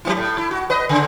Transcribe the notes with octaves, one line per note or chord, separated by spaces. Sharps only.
F#3 A#3 E4
A2
E4
F#4
B4 D#5
C#3